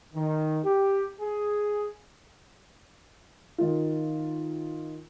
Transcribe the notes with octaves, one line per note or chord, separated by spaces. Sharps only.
D#3
G4
G#4
D#3 F4